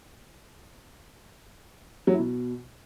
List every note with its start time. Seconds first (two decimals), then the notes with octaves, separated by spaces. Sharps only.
2.07 F#3
2.13 E4
2.19 B2